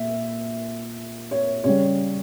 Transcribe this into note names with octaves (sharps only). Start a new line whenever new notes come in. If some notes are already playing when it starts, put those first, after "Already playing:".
Already playing: A#2 E5
C#5
C#3 G3 C#5